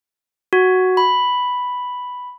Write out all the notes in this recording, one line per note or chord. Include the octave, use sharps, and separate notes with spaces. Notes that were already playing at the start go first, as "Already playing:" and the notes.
F#4
B5